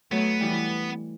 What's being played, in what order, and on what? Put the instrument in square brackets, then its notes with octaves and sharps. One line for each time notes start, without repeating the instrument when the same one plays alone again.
[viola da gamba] F#3 A3 [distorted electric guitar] B3
[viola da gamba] E3 G3